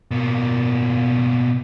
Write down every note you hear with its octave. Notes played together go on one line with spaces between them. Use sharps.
B2 A#3